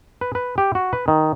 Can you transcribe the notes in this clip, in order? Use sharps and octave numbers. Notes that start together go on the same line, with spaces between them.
B4
B4
G4
F#4
B4
D#3